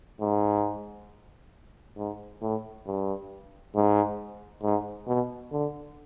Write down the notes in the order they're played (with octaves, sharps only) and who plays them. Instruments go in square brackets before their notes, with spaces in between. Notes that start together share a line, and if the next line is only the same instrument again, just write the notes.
[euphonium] G#2
G#2
A2
G2
G#2
G#2
B2
D3